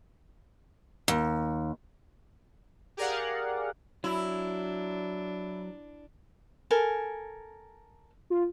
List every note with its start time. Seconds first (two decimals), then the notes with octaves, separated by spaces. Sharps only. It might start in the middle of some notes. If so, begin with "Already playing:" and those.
1.08 D#2
2.97 G4 G#4 A#4 D5 F5 F#5
4.04 F#3 D4 E4
6.71 A4 A#4 G#5
8.30 F4